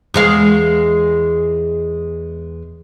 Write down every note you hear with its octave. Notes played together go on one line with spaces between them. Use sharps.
E2 G#3 F5